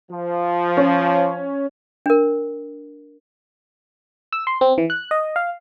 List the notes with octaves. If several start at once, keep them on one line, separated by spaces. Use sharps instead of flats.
F3
C#4
D4 A#4
E6
C6
C4
E3
F#6
D#5
F5